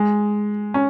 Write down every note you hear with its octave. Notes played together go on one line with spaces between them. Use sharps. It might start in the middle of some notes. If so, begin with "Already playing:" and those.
Already playing: G#3
C#4